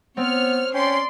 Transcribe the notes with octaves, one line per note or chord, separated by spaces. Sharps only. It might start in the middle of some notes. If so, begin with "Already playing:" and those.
B3 C4 C#5 F6
C#4 D5 G5 C6